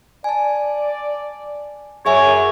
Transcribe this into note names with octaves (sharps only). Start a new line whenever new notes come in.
D5 G#5 A5
F#2 G#4 C#5 E5 G#5